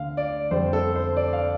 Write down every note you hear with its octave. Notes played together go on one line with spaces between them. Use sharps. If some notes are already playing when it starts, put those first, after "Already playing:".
Already playing: D2 D3 F5
D5
F2 D3 G3 C5
A4
C5
D5
F5